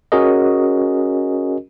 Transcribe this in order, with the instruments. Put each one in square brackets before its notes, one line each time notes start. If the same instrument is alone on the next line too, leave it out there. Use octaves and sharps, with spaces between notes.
[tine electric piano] C#4 F#4 G#4 A#4 D#5